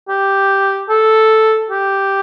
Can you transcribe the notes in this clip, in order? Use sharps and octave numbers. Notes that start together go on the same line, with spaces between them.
G4
A4
G4